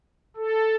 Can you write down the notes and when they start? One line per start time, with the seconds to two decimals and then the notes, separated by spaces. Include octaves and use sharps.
0.37 A4